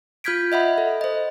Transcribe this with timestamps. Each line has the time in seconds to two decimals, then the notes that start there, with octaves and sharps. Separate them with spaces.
0.24 F4 F6 G6 G#6 B6 D7
0.52 D#5 E5 F#5 B5
0.78 A4
1.01 C5 D#5